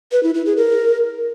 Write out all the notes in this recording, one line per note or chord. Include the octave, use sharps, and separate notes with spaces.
B4
E4
E4
G#4
A#4